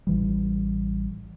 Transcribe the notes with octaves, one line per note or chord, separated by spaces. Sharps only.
A1 E3 G3